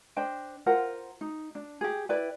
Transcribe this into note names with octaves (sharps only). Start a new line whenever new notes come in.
D4 C5 D#5 G5
F4 A#4 C5 F#5
D#4
D4
G4 G#4
E4 B4 D5 G5